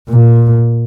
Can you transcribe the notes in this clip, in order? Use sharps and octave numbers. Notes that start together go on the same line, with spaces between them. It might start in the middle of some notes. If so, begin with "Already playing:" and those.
A#2